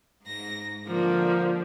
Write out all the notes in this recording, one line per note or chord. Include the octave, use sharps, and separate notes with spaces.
G#2 A#6
D3 F3 A#3